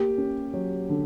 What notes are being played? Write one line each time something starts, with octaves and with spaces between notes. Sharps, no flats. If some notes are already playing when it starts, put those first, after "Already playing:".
Already playing: A#3 G4
C#4
F#3
D3